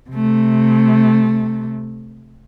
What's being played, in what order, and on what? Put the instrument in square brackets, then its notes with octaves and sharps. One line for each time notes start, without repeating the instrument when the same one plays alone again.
[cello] C3 A3